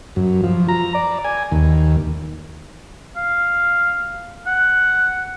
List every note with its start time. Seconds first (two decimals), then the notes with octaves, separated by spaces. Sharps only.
0.16 F#2
0.43 F3
0.69 A#5
0.95 D5
1.24 G#5
1.52 D#2
3.16 F5
4.47 F#5